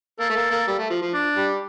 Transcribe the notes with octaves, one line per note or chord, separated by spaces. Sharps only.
A#3 A4
A3
A#3
A#3
G3
A3
F3
F3
D4
G3